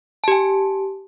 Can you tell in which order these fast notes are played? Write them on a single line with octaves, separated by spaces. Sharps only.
A5 G4 G#5